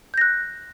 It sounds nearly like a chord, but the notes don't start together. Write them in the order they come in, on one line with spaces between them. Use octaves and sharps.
G6 A#6 F#6